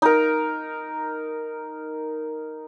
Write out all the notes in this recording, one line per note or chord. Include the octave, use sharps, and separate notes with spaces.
D#4 A#4